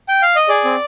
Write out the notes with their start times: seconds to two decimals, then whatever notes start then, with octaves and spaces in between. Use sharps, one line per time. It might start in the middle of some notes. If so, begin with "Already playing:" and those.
0.09 G5
0.22 F5
0.36 D#5
0.48 G#4 D5
0.65 C4